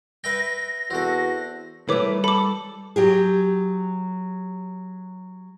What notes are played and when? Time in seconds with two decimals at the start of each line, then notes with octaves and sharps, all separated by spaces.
0.24 B4 E5 G5 A#6
0.90 E2 C4 F#4 A4
1.89 E3 G3 A3 A#4 B4 C#5 D6
2.24 A4 B5 D6
2.96 F#3 G4 G#4